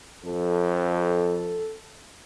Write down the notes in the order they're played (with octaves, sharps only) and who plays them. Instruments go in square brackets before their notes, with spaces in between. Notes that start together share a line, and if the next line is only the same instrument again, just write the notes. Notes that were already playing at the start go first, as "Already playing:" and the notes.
[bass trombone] F2 [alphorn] A4